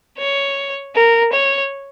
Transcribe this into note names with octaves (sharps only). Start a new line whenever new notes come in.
C#5
A#4
C#5